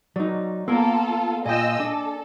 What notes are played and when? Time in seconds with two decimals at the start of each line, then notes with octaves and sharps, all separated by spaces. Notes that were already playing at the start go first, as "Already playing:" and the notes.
0.16 F#3 D#4 D5
0.68 A#3 B3 F4 A4 A#4
1.46 A#2 F4 D#5 G5 G#5 E6 A#6
1.80 D4 A4